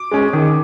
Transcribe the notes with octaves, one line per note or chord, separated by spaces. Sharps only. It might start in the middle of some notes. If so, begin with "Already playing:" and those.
Already playing: D6
G#3 C#4
D#3